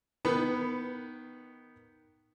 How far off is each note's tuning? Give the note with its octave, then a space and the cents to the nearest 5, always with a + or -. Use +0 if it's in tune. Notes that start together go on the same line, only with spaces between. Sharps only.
D#3 +0 B3 +0 B4 +20